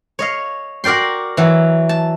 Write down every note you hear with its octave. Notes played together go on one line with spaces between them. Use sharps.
C#5 D#5 F5
F#4 A#4 D5 G5 C6
E3 F#3
A5